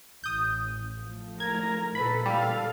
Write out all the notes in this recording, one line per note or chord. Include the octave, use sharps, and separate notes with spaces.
A1 D#6 G6
F3 A3
A#4 A#5 G#6
A#2 A4 B4 B5
G3 A4 F5